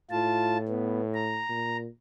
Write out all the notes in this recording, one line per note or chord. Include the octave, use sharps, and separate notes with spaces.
A2 F4 A5
B3
A#5
A#2